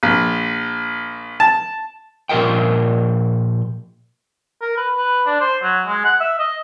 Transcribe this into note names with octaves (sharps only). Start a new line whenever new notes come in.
A#1
A5
A#2 F3 G4 A#4 D#5 G5
A#4
B4
B4
D4
C5
F#3
G#3
F#5
E5
D#5